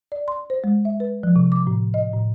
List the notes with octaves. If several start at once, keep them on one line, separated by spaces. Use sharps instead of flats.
D5
C6
C5
G#3
E5
B4
F3
C3
D6
A2
D#5
A2